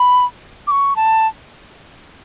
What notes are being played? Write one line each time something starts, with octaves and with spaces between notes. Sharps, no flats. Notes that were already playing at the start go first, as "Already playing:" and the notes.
Already playing: B5
D6
C#6
A5